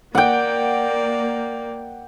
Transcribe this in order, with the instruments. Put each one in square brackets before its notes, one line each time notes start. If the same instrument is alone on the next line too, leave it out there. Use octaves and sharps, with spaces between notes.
[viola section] A#3 [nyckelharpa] D5 [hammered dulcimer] F#5 G5